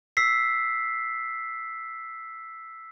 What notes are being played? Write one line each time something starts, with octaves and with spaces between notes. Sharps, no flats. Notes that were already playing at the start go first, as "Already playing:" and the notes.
E6 B6 C7